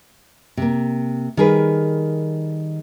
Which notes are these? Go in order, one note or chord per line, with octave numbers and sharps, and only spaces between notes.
C3 A#3
D#3 G3 G#4 A#4 B4